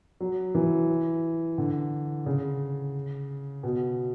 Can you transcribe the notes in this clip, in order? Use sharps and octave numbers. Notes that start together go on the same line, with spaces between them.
F#3
E3
D3
C#3
B2